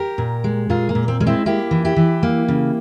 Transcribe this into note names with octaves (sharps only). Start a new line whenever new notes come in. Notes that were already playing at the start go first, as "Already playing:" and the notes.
Already playing: G4 A#4
A#2
G#3
A#2 F4 G#4
A#3
A#2
C4
G#3 C#4
C4 E4
A#3 E4 G4
E3
E4 G4
E3
A#3
C#3